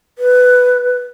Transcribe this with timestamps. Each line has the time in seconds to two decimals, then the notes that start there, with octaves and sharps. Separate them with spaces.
0.18 B4